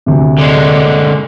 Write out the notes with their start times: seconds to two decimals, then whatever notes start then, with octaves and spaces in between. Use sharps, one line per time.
0.06 D2 C3
0.38 D3 G#3